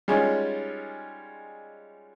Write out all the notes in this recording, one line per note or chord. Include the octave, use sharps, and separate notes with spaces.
G3 G#3 C#4 D#4 F4